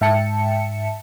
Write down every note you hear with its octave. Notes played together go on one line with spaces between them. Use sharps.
G#2 E5 G5 A5 C#7